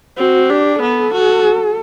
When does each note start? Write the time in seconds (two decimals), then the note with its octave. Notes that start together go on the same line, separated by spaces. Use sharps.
0.18 C4 F#4
0.50 D4 G4
0.81 B3 A4
1.14 F#4